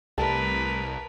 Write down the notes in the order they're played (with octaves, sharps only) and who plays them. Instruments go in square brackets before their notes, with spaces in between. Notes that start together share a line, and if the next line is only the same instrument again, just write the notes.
[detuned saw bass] C2 [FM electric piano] G3 A3 [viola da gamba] A#4 B4 [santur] A5